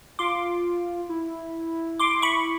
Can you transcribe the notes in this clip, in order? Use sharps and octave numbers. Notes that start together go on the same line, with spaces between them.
F4 C6 D6
E4
C6 D6
B5 C#6